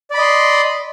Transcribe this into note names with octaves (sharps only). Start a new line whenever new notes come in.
D5 D#5 B5 C6